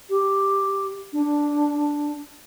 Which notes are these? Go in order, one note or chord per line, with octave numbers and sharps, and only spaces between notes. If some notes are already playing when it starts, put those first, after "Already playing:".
G4
D4